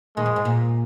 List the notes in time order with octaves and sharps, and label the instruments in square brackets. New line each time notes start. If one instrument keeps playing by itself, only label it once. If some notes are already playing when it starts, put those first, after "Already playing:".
[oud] A#2 D#3 [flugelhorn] G#3
[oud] F2
G#2
A#2